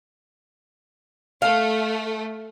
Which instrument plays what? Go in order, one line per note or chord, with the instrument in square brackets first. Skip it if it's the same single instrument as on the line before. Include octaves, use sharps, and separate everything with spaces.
[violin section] A3 [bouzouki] F5